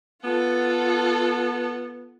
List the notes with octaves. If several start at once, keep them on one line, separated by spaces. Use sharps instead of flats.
B3 F4 A4 F#5